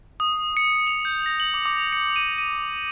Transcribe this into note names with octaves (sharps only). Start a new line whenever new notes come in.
D#6
C#7
F7
G6
A#6
F#7
D6
D6
C#7
D#7
D#7